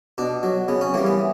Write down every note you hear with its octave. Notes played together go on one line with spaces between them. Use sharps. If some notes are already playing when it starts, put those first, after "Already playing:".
B2 D4
F#3
C#3 B3
C#4
E3 G3 A#3
B3